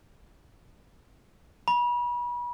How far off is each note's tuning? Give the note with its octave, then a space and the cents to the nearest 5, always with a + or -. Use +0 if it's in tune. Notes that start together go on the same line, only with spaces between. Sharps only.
B5 -35